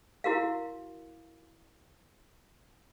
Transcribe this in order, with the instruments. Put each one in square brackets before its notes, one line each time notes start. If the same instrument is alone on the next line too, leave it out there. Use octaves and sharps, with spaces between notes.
[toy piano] E4 F#4 A#4 F5